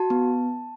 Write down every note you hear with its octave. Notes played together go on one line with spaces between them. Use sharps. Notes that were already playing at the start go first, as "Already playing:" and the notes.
Already playing: F#4 A5
B3